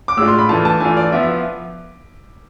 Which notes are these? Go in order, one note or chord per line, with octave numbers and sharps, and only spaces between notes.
D6
A2 G#3 D4 F4 E6
C6
B5
E3 A3 D4 F4 A5
A5
E3 A3 D4 F4 G#5
D5
F3 B3 F4 E5
E5